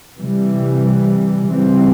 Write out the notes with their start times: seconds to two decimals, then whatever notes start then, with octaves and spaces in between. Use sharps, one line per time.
0.18 C3 E3 G3
1.49 C#3 E3 G3 C4